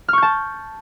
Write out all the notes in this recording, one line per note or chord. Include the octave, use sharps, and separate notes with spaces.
A5 C#6 F6 G6